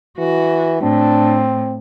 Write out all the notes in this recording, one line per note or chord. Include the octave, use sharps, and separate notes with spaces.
E3 F#4
A2 C4 D4